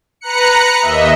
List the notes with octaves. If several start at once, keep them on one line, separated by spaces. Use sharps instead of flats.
B4 A#5 F#6 C#7
D#2 D#5 E5